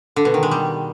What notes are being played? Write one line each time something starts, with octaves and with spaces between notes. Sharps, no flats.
D3
B2
D#3
G#3
G3